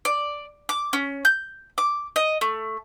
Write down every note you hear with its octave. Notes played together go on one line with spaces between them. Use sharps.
D5
D6
C#4
G6
D6
D#5
A3